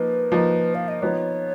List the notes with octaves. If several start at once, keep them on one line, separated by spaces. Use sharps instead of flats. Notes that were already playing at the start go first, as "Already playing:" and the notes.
Already playing: F3 A#3 D#4 B4
F3 A#3 D#4
F5
D#5
F3 B3 D#4 C#5